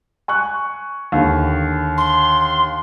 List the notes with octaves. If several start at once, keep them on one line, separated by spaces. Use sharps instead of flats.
G#5 C#6 F#6
D#2 D3
C6